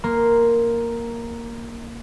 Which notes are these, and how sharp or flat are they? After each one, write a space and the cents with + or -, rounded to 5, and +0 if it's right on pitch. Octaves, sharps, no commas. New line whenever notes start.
A#3 +0 C6 +0